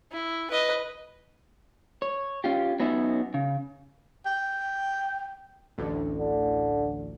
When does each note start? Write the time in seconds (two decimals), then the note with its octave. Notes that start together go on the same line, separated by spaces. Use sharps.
0.12 E4
0.51 B4 D#5
2.02 C#5
2.44 C#4 F4 G4
2.80 F#3 B3 C#4 D#4 E5
3.34 C#3
4.26 G5
5.78 A1 D2 A2
6.18 D3